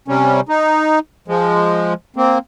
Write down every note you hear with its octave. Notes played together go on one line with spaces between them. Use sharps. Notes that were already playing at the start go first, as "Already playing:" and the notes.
C3 G3 C#4
D#4
F3 G#3
A#3 C4